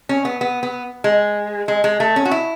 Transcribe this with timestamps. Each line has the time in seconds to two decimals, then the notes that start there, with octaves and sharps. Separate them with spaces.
0.09 C#4
0.25 B3
0.41 B3
0.63 B3
1.04 G#3
1.68 G#3
1.84 G#3
2.00 A3
2.16 C#4
2.25 F#4
2.31 E4